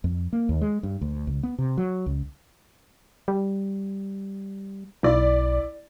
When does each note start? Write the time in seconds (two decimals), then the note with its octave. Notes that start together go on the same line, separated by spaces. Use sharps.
0.04 F2
0.33 A#3
0.49 D#2
0.61 G#3
0.83 G2
1.01 D2
1.27 C#2
1.43 B3
1.58 C3
1.77 F#3
2.06 C#2
3.28 G3
5.03 B1 E4 D5